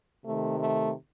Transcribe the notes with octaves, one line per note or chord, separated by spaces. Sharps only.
C3 D#3 A3
A3